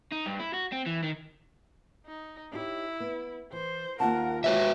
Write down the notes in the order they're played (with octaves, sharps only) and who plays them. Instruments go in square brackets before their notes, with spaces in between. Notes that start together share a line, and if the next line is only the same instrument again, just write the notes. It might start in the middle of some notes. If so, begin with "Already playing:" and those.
[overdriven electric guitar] D#4
G2
E4
F#4
C4
E3
D#3
[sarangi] D#4
[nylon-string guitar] D#4 G4 C#5 [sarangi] E4
[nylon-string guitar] B3
[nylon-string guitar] E3 [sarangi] C5
[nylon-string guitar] D#2 F4 A5 [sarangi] A#4 [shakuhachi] F#5
[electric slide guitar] F#4 B4 E5 [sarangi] G4 [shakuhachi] C#5